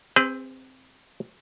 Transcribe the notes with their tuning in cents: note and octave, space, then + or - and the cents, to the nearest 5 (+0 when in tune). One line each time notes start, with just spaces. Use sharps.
C4 +0 G#4 -40 B4 +35